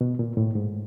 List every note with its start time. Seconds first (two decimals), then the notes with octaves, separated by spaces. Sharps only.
0.01 B2
0.19 A#2
0.37 A2
0.55 G#2